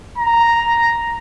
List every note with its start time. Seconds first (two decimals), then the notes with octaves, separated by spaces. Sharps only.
0.18 A#5